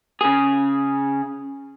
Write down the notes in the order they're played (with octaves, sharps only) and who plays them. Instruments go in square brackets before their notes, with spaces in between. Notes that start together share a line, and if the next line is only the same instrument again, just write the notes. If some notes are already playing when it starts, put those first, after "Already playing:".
[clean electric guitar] C#3 G#4